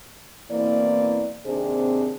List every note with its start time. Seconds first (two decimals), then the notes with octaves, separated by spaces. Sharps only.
0.50 B2 E3 A#3 C4 E4 D5
1.46 D#2 C3 C4 D4 G#4